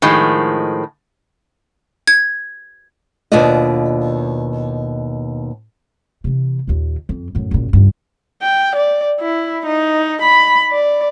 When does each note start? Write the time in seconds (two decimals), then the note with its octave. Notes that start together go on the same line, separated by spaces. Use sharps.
0.02 A2 D#3 F3 G#3
2.07 G#6
3.32 D#2 B2 D4 F4 D5 D#5
6.24 C3 E3
6.67 D#2 A#2
7.09 F2
7.35 F#2 A2
7.51 F#1 A#2
7.73 C#2 G2
8.42 G5
8.76 D5
9.21 E4
9.66 D#4
10.22 B5
10.71 D5